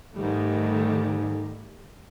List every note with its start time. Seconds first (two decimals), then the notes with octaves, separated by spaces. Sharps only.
0.15 G#2 D#3 G3 A3